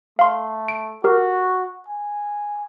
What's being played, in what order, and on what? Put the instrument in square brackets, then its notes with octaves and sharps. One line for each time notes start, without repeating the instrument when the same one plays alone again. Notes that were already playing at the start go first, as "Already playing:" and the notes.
[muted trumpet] A3 [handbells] F5 C6
[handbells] D7
[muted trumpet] F#4 [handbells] G4 A#4
[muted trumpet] G#5